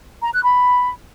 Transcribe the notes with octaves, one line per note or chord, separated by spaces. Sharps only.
A#5
F#6
B5